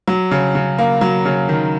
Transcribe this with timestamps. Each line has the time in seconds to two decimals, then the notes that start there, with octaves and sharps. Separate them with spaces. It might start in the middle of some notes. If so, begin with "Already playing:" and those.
0.08 F#3
0.31 C#3
0.55 C#3
0.78 A#3
1.01 F#3
1.25 C#3
1.49 D#3